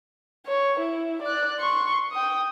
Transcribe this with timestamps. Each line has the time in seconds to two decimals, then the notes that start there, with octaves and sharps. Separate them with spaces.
0.47 C#5
0.80 E4
1.23 D5 F#6
1.59 C6 C#6
2.12 G5 D#6